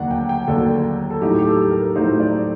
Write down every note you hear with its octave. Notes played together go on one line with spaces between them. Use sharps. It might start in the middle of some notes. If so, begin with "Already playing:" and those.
Already playing: D#2 D3 F#3 A#3 D4 F#5
G5
G5
D#2 D3 F#3 A#3 D4 A4
A4
A2 F#3 A3 D#4 G4
G4
A4
A#4
A2 F#3 A3 D#4 C5
D5